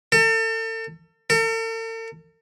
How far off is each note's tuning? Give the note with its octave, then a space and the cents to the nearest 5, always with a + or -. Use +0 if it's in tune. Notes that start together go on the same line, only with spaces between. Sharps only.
A4 +35
A4 +45